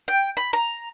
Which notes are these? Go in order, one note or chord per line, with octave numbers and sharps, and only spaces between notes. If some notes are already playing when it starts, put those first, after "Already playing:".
G5
B5
A#5